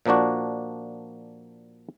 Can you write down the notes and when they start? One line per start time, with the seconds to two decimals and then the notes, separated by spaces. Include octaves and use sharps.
0.06 A#2 F3 A#3 D4 F#4